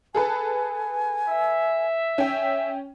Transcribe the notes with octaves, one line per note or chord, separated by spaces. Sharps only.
G#4 A4 B4 G#5
E5
C#4 G5